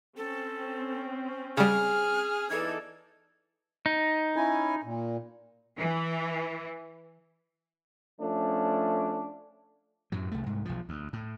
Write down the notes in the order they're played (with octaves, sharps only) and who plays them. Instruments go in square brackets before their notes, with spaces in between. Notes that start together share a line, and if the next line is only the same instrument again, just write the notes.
[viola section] C4 C#4 [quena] A4
[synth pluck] C#3 G3 [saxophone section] G#4 [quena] F6
[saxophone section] E2 E3 [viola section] D#4 A4 D5 [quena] G#6
[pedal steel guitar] D#4
[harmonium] C#4 E4 G#5
A#2
[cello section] E3
[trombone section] F3 A3 C#4 D4
[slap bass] F#2 A2 F#3
C2 A3
C2 G#2
B1 F3
D2
A2